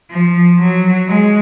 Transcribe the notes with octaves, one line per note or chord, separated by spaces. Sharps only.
F3
F#3
G#3